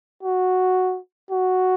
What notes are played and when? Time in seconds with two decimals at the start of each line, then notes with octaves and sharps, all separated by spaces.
0.23 F#4
1.30 F#4